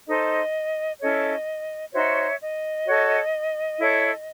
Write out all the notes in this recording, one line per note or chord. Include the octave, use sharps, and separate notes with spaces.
D#4 A4 C5 D#5
C#4 E4 A4 C#5 D#5
D#4 F#4 C5 C#5 E5
D#5
F#4 A4 C#5
E4 A4 C#5